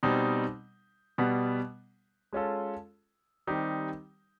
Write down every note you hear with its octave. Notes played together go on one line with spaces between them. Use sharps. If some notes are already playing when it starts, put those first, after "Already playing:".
B2 G3 C4 D#4
B2 G3 B3
G#3 C#4 F4 A4
D#3 G3 C4 D#4 G4